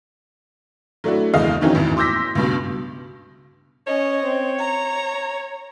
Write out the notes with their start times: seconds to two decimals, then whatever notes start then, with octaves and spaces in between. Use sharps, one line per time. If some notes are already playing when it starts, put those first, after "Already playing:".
1.04 F#3 A3 D4 E4 F#4
1.34 F#1 E2 G#3 F#4 D#5 F5
1.61 D#3 E3 F#3 C4 C#4 D#4
1.75 A1 E2 E3
1.97 C6 D6 E6 G6 A#6 B6
2.35 C#2 G2 B2
3.87 C#4 C#5 D#5
4.24 C4
4.59 A#5